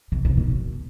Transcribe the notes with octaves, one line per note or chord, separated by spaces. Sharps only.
C3
C3
B2
B2